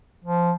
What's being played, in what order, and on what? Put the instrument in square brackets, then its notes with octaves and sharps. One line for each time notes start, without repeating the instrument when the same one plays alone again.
[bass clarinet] F3